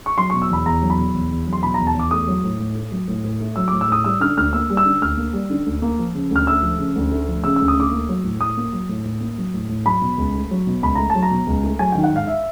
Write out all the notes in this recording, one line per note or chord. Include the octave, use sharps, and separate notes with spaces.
C#6
F#3 C6
B2 C#6
E6
E2 B5
E2 A#5
F#3
B5
B2
E2
E2
F#3
C6
B2 B5
A#5
E2
A5
E2 D6
A3 D#6
F#3
A2
A2
A3
F#3
A2
A2
A3
F#3 E6
A2 D6
E6
A2 D#6
G3 E6
D3 F6
D2 F6
A#3 E6
G3
E6
D3
D2 F6
A#3
G3
D3
D2
A#3
F3
C#3
D2 F6
A3 E6
F3
C#3
D2
A3
F3
C#3 E6
D2 E6
D#6
A3 D6
A#3
F#3
A2
A2 D#6
A#3
F#3
A2
A2
A#3
F#3
A2
A2
F#3 B5
B2
C#2
A3
F#3
B2
C#2 B5
A3 A#5
A5
F#3
A#5
B2
C#2
A3
F#3 G#5
D#3 G5
F#5
G#2 F5
E5